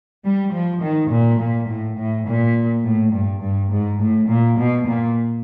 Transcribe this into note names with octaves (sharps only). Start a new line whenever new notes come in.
G3
F3
D#3
A#2
A#2
A2
A2
A#2
A2
G2
G2
G#2
A2
A#2
B2
A#2